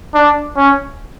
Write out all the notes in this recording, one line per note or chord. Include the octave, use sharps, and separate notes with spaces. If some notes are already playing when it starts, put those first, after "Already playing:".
D4
C#4